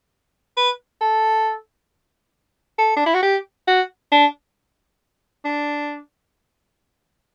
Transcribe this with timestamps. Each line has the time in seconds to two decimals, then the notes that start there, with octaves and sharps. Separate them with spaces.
0.57 B4
1.01 A4
2.79 A4
2.97 D4
3.06 E4
3.14 F#4
3.23 G4
3.68 F#4
4.12 D4
5.45 D4